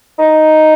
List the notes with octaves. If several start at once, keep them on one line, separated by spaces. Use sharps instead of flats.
D#4